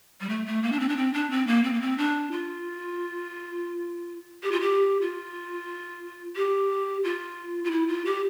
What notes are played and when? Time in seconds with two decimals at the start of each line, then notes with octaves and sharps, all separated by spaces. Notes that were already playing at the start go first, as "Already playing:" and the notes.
0.21 G3
0.29 A3
0.46 A3
0.63 A#3
0.72 D4
0.80 C4
0.89 D4
0.97 C4
1.14 D4
1.31 C4
1.47 A#3
1.64 C4
1.73 A#3
1.81 C4
1.98 D4
2.32 F4
4.43 G4
4.52 F4
4.61 G4
5.01 F4
6.36 G4
7.04 F4
7.64 F4
7.71 E4
7.88 F4
8.05 G4